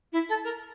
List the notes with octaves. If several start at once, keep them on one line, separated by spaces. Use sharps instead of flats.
E4
A4
A#4